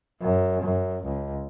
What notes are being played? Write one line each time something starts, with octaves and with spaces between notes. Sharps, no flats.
F#2
F#2
C#2